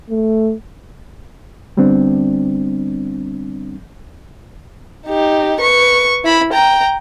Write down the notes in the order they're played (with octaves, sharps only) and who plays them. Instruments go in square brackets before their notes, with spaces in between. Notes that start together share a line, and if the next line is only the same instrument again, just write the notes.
[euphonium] A3
[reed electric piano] D3 G3 B3 C4 D4
[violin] D#4 G4
B4 C#6
E4 B5
G5 A#5